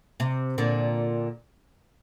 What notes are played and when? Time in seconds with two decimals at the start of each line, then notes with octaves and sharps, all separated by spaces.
0.20 C3
0.58 A#2 D3